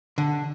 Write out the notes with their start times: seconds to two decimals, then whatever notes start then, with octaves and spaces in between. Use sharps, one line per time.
0.18 D3